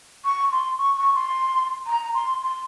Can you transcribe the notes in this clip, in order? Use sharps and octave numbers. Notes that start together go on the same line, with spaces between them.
C#6
C6
C#6
C#6
C6
A#5
C6
C6